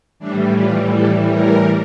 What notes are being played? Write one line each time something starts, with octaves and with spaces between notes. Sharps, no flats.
A2 E3 G3 D4
F4
A4
A#4